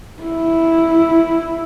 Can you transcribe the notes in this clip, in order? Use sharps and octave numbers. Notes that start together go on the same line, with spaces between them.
E4